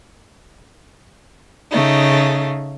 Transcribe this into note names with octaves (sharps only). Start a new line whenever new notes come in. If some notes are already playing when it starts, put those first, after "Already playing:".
C#3 A3 D#4